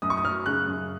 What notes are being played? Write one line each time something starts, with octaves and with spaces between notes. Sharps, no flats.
F#2 D#6
C#6
D#6
F#3 F6
C#3 F#6
F#2